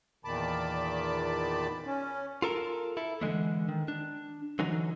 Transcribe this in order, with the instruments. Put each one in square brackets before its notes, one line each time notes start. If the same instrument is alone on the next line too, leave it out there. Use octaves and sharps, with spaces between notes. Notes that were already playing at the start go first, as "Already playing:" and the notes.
[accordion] E2 A#2 D#3 A5 B5 D6
C#4
[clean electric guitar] F4 A4 A#4
E4 A4
D3 E3 G#3 A3
D#3
D4
D3 E3 F#3 D#4